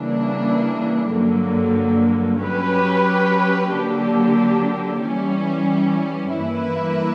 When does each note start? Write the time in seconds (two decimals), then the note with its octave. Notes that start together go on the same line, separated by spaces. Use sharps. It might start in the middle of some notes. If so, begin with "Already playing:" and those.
Already playing: C#3 E3 G3 A#3 D4
1.12 G2 D3 F#3 A#3
2.42 F#3 C#4 G4 B4
3.72 D3 F#3 A#3 D4 G4
5.03 E3 G3 C#4
6.33 G2 E3 A#3 E4 B4